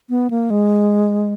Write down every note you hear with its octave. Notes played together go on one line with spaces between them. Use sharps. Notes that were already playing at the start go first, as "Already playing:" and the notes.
B3
A#3
G#3